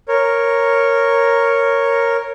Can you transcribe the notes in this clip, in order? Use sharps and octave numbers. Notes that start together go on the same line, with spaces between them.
A#4 C#5